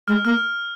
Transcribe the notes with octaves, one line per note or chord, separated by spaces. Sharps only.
G#3 F6
A#3 F6